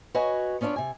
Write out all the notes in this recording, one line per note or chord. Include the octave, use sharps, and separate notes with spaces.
F#4 B4 C#5 D#5 G#5
B3 C#4 D4 F4 C#5
C3 G#5